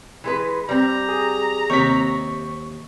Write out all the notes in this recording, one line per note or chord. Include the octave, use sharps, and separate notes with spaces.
E3 G#3 B4
G3 C4 A#5
G#4
D#2 C3 C4 C#6 B6